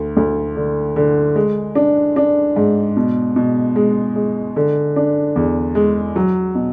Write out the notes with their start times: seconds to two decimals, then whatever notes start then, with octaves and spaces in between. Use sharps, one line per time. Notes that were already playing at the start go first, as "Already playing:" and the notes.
Already playing: D2
0.17 D2
0.56 D3
0.96 D3
1.36 G#3
1.75 D4
2.16 D4
2.56 G#2
2.96 B2
3.36 B2
3.76 G#3
4.16 G#3
4.56 D3
4.96 D4
5.36 E2
5.75 G#3
6.16 F#3
6.55 B2